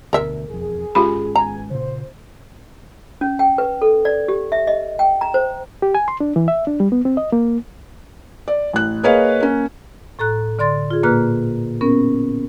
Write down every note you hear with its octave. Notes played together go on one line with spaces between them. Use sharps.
D2 B2 A#4 E5
E1 F2 G#4
G#1 G#3 C#4 F4 G4 B5
B3 G#4 G#5 A#5
A#2 C#3 C5
C#4
G5
B4
A4
D5
G4
E5
D#5
G5
A#5
C5
G4
G#5
C6
D4
E3
E5
D4
G3
B3
C4
D#5
A#3
D5
A1 F#6
A#3 G#4 B4 C#5 D#5 F5
A#3 C#4
A2 A4 A#5 F#6
D3 D5 C6 A6
F4 G#4
A#2 A#3 B4 A#5 F6 F#6
B3 C#4 A#4